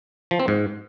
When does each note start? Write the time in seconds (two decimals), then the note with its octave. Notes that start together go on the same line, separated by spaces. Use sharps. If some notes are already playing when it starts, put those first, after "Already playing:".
0.31 F3
0.40 C4
0.48 G#2